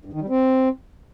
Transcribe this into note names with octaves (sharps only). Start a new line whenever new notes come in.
G2
D#3
G3
C4